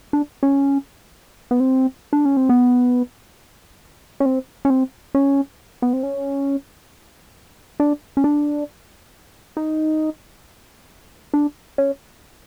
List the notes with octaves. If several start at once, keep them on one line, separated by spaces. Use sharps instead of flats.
D4
C#4
B3
C4
D4
C#4
C4
B3
C#4
C4
C#4
C4
C#4
B3
C4
C#4
D4
C#4
D4
D#4
D4
C#4